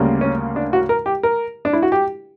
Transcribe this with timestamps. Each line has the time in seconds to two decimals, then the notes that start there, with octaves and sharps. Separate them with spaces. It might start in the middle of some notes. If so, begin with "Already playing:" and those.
Already playing: D2 C#3 G3 A#3
0.21 C#4
0.56 D4
0.73 F#4
0.89 A#4
1.06 G4
1.23 A#4
1.65 D4
1.73 E4
1.83 F#4
1.92 G4